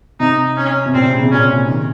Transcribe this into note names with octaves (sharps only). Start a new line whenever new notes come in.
C3 D#4
C#4
C3
A#2 C4
C3
C#3
C3
A#2 C#4
C#3
C3
D#3